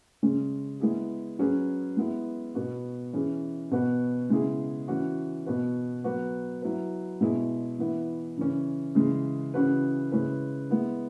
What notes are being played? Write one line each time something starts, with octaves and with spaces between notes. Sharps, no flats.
C#3 G#3 C#4
G#3 B3 E4 G#4
F#3 C#4 G#4 B4
G#3 B3 E4
B2 B3 F#4
E3 C#4 G#4
B2 B3 F#4 B4
C#3 G#3 B3 E4 G#4
E3 C#4 F#4
B2 B3 F#4 B4
F#3 B3 F#4 B4
F#3 E4 B4
B2 G#3 B3 E4 G#4
E3 B3 E4
C#3 E3 C#4
C#3 E3 G#3
C#3 E3 C#4 F#4 B4
C#3 G#3 C#4 E4 B4
G#3 B3 E4